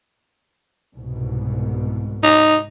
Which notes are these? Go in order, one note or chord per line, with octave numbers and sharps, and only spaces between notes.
C2 G#2 B2
D#4